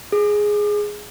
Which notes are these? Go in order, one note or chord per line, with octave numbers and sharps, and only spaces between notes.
G#4